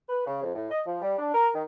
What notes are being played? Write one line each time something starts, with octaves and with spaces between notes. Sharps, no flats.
B4
C#3
F2
A2
D#5
F3
G3
D4
A#4
D#3